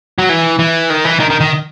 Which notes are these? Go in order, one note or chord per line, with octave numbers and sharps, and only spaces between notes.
F#3
E3
E3
D#3
E3
D#3
D#3
D#3